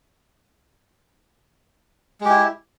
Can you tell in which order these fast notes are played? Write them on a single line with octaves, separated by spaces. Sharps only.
G#3 G4 E4